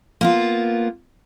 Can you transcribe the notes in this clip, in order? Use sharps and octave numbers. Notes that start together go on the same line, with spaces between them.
A#3 B3 F4